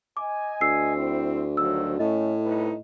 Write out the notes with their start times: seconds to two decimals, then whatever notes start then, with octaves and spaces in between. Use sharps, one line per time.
0.17 D#5 G#5 D6
0.61 D2 E6 C7
0.96 C4 E4
1.57 D#3 F3 F#3 E6
1.99 A2 A3 C#4 D#5
2.44 C2 D#4 B4